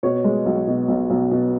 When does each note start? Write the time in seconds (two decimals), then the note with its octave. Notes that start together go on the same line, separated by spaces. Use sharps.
0.03 B2 C#5
0.24 G#3
0.46 B1
0.67 B2
0.88 B1
1.10 B1
1.31 B2